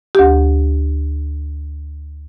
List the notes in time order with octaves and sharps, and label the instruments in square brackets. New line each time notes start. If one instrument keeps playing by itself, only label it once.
[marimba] D2 G4